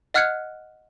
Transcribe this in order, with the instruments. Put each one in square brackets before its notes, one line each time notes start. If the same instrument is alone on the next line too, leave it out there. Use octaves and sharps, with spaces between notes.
[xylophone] D#5 F#5 F6 F#6 G#6 C#7